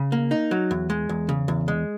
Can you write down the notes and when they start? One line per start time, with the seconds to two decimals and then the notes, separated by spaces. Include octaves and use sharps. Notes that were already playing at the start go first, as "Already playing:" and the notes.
Already playing: C#3
0.12 A#3
0.31 D#4
0.51 F#3
0.71 E2
0.90 G#3
1.09 E2
1.29 C#3
1.48 E2
1.68 G#3